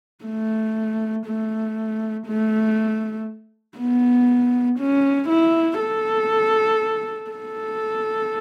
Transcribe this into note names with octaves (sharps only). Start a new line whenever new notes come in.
A3
A3
A3
B3
C#4
E4
A4
A4